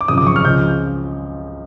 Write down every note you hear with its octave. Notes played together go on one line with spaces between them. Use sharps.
D6
G#1 F#2 C#3 F3 D#6
D6
C#6
F6
C#2 C#3 F3 G6